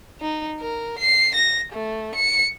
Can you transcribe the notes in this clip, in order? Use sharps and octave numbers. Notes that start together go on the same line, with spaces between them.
D#4
A#4
C7
A#6
A3
C#7